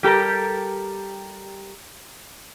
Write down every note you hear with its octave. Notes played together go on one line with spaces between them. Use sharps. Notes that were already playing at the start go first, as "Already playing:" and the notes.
G3 G4 A4 A#4